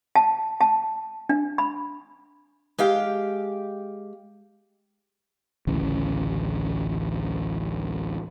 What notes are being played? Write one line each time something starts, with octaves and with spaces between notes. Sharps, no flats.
A5
A5
D4
B5
G#3 G4 F5 G5
A1 D2 C#3